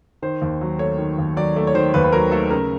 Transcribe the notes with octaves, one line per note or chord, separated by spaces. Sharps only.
D#3 C5
D#2
F#3
A3 C#5
D#3
D#2
F#3 D5
A3 D5
C#5
D#3 C5
D#2 B4
B4
F#3 A#4
A3 A4
C#3 A#4